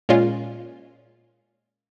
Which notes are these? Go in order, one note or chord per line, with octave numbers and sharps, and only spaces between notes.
A#2 G#3 C#4 F4